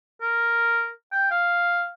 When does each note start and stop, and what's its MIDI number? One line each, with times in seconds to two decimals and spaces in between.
0.21 0.90 70
1.13 1.28 79
1.31 1.90 77